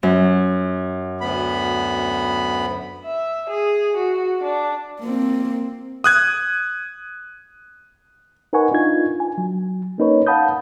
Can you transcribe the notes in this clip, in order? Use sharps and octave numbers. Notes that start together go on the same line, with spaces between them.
F#2
D2 B3 B5
E5
G#4
F#4
D4
A#3 C4
D#6 F#6 G#6
D#4 A#4 B4 F#5 G#5 C#6
D4 D#4 F4 G#6
G#5
F#3
A#3 C#4 D#4 A#4 B4 C#5
F5 F#5 A5 B5 D#6 G6